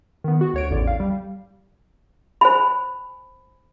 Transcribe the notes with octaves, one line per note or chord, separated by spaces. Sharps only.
D#3 B3
F#4
D2 C#5 D7
A1 E2 D3 D5
F5
G3
C5 G#5 B5